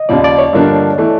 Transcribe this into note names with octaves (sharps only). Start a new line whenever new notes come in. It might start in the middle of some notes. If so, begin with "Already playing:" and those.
Already playing: D#5
D#2 C#3 F3 D5
D5
C#5
G2 D3 F3 A#3 D4
E3 A3